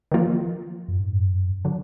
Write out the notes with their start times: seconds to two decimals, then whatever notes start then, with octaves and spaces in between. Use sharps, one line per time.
0.12 D#3 F3 A#3 F4
0.88 F#2
1.00 G#2
1.13 F#2
1.65 D3 F#3